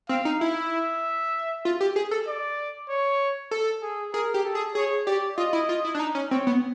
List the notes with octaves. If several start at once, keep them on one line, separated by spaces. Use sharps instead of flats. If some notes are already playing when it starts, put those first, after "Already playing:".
C4 F5
D#4
E4 E5
F4
G4
G#4
A4
D5
C#5
A4
G#4
G#4 A#4
G4
A4
G#4
G#4 C#5
G4 D5
F4 D#5
E4
F4
E4
D4
D#4
C#4
C4 C#5
B3